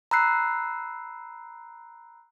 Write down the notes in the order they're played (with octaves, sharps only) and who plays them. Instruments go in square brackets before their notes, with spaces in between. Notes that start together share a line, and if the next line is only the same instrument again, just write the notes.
[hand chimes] A#5 B5 E6 F#6 C7